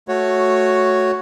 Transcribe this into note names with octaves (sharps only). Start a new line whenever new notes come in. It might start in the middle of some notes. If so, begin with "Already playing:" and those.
A3 F#4 C#5